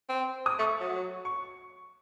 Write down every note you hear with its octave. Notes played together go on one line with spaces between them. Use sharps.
C4
D#6
A3 C#6
F#3
C#6